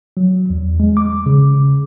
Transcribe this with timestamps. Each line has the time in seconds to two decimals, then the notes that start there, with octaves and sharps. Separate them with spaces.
0.17 F#3
0.50 E2
0.80 G#3
0.97 D6
1.26 C#3